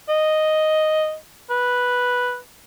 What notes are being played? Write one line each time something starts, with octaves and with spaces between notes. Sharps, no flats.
D#5
B4